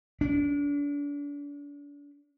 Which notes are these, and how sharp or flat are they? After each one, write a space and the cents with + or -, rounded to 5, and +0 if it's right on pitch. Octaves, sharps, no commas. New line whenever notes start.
D4 -35